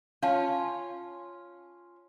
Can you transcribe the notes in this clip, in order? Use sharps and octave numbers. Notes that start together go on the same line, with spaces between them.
C#4 F4 C#5 F5 A5